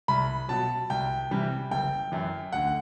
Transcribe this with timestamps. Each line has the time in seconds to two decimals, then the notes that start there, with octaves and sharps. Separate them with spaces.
0.08 C2 B5
0.49 B2 F#3 A5
0.90 C2 G5
1.31 C3 E3 G3
1.71 F#1 G5
2.12 F#2 E3
2.53 D2 F#5